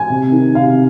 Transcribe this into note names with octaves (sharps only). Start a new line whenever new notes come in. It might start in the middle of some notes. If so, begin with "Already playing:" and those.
Already playing: G#5
C3
D#3
C3 F5